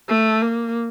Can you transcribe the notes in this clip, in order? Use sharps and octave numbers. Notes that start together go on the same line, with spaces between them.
A3
A#3